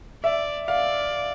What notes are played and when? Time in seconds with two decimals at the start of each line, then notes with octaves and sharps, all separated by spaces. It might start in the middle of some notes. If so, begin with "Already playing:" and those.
0.24 D5 E5
0.68 D5 F5